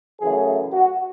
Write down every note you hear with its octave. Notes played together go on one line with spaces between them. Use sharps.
F#2 C#3 E3 A3 G#4
F#4